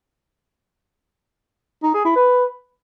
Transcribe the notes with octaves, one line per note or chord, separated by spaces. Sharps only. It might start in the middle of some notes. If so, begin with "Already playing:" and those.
D#4
G#4
E4
B4